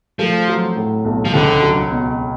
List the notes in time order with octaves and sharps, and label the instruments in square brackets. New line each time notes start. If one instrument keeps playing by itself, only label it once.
[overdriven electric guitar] F3 [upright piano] A3
[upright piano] F#3
A2
B1
[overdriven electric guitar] F3
[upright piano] C#2 [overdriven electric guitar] D3
[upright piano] F#3
B2